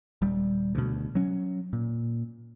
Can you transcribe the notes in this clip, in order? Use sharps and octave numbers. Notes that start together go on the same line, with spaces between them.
D#1 G3
D2 B2
F#3 C#4
A#2